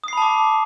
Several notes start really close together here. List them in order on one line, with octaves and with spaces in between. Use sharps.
D#6 C7 B5 A5 D6